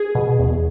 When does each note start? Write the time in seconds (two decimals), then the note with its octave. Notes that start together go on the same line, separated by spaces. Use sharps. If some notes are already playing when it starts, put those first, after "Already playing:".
Already playing: G#4
0.15 B2
0.39 E2